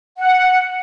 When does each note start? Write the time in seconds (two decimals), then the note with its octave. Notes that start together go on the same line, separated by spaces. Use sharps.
0.18 F#5